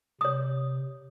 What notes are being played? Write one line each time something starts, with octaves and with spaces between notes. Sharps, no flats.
C3 C#5 D#6